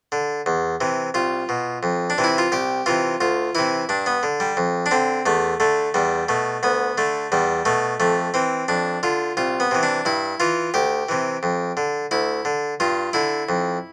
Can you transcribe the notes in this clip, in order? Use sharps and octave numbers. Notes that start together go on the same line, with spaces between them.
D3
E2
C3 E3
C2 F4
B2
F2
D4
C3 E3
E4
F4
C2 G4
C3 E3 F4
D2 F4
C3 E3 E4
G2 D4
B3
D3
G3
F2
D4
D3 C4
E2 A3
D3 A3
E2 G3
B2 A3
D2 B3
D3 A3
E2 G3
B2 A3
F2 A3
E3 C4
F2 D4
D3 F4
C2 F4
B3
C3 E3
D4
G2 E4
E3 F4
D2 G4
C3 E3
F2
D3
D2 E4
D3
G2 F4
D3 E4
F2